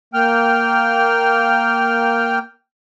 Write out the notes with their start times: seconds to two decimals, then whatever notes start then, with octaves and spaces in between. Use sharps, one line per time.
0.14 A#3 G5 F6